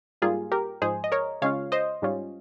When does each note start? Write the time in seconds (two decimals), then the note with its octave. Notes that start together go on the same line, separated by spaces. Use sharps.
0.22 G#2 G3 A#3 F4 G#4
0.52 G4 A#4
0.82 G#2 F3 G#3 G#4 C5
1.04 D#5
1.12 A#4 C#5
1.42 C#3 G#3 C#4 F4 C#5 F5
1.72 C5 D#5
2.02 G#2 G3 C#4 F4